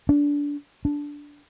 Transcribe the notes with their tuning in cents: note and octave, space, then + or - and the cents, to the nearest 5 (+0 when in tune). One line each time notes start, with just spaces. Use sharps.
D4 -20
D4 -10